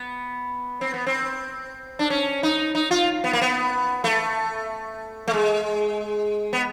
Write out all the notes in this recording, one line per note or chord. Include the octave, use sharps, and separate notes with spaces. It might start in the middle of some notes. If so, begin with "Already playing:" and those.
Already playing: B3
C4
B3
C4
D4
C#4
D#4
D#4
F4
B3
A#3
B3
A3
A3
G#3
B3